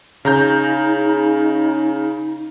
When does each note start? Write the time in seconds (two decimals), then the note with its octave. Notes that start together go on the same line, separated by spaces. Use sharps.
0.25 C#3 D#4 A#5 G6